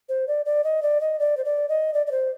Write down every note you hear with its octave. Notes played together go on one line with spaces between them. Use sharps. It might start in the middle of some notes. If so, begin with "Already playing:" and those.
C5
D5
D5
D#5
D5
D#5
D5
C5
D5
D#5
D5
D5
C5